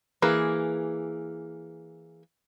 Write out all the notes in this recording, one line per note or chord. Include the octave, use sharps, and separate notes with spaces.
E3 A#3 G#4